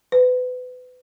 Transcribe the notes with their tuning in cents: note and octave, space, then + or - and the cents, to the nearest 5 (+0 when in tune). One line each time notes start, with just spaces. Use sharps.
B4 +30